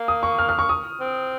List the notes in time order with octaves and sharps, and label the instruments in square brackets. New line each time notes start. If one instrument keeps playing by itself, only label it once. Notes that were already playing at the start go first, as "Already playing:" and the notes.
Already playing: [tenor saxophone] A#3
[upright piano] D#6
C#6
F6
F6
C#6
D#6
[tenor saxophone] C4